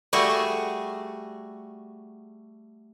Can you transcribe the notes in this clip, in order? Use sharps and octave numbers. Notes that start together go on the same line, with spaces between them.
G3 A3 F#4 G#4